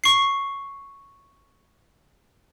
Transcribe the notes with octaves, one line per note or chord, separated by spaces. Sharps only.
C#6 C7